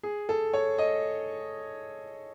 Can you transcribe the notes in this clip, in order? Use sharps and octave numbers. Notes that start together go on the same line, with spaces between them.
G#4
A4
C#5
D#5